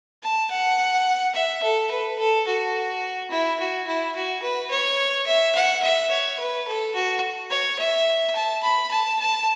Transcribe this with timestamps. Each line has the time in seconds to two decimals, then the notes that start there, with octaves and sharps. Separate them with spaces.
0.22 A5
0.51 F#5
1.34 E5
1.63 A4
1.91 B4
2.19 A4
2.47 F#4
3.31 E4
3.59 F#4
3.87 E4
4.15 F#4
4.42 B4
4.70 C#5
5.27 E5
5.55 F#5
5.82 E5
6.11 C#5
6.39 B4
6.67 A4
6.95 F#4
7.50 C#5
7.79 E5
8.36 A5
8.63 B5
8.91 A5
9.20 A5